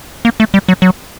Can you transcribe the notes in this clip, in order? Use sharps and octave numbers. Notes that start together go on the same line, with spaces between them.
A#3
A3
G3
F#3
F#3